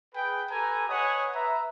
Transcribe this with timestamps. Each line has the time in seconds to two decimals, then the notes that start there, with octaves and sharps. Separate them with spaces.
0.15 G#4 B4 G5
0.51 G4 A4 B4 G#5 A#5
0.89 B4 C#5 D#5 F#5 G#5 D#6
1.35 B4 E5 A#5